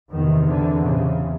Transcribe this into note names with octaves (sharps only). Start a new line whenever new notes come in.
E2 C3 D#3
D3
C#3